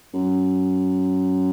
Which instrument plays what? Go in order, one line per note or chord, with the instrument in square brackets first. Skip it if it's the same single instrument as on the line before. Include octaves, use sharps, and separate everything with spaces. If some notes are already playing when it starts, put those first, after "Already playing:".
[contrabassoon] F#2